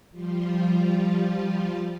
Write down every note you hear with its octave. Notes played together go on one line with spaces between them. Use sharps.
F3 G3 F4